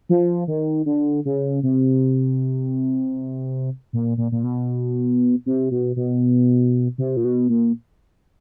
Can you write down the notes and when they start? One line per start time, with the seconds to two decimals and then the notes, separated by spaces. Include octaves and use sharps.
0.09 F3
0.48 D#3
0.86 D3
1.25 C#3
1.63 C3
3.93 A#2
4.18 A#2
4.32 A#2
4.43 B2
5.46 C3
5.71 B2
5.96 B2
6.98 C3
7.17 A#2
7.25 B2
7.49 A#2